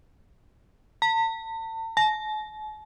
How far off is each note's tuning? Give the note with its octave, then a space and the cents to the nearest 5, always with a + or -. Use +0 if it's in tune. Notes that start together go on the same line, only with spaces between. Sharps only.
A5 +40
A5 -45